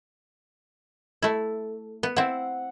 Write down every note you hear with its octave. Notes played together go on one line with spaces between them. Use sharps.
A3 E4
B3
C4 E4 F#5